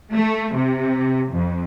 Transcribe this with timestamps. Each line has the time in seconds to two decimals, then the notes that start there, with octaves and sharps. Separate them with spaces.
0.14 A3
0.55 C3
1.32 F2